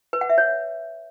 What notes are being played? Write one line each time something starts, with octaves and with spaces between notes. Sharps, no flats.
B4
F#5
E5
C#5